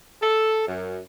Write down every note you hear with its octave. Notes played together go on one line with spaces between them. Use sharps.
A4
F#2